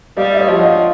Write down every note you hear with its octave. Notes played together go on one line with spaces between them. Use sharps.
G3 D#5 F5
E5
C#5 D#5
F3
F#5
D#5 F5